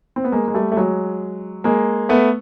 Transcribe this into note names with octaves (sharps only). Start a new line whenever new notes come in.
C4
B3
G#3 A#3
G#3
G3 A3
A3
F#3 G#3
G#3 A#3
A3 B3